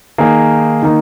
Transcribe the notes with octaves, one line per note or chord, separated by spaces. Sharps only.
D#3 A#3 D#4 G#4
D#3 A#3 D#4